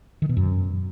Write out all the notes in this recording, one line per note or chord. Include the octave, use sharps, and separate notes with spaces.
D#3
B2
F#2